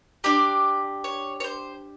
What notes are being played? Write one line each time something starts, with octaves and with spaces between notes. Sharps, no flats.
D4 G4 D5
C#5
C#5
C5